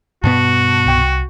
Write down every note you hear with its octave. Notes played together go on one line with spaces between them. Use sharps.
G2 B2 B3 F#4 A5
C2 G5 C#6